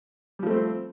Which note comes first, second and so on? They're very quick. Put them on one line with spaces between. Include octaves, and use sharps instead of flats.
G3 F3 A3 C4